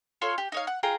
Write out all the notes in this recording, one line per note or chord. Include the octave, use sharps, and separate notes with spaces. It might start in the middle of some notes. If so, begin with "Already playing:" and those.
F4 A4 C#5 C6
G4
D#4 C#5 F5
F#5
F4 G#4 G5 A#5